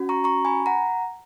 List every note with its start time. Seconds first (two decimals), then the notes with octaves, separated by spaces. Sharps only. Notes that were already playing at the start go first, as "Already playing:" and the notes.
Already playing: C#4 F#4
0.09 A#5 C#6
0.24 A#5 C#6
0.45 G#5 B5
0.66 F#5 A#5